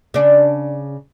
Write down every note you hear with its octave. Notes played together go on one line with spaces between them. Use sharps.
C#3 D4